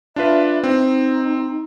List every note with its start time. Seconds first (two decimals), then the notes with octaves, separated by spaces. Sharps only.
0.16 D4 F4 B4 E5
0.64 C4 D#4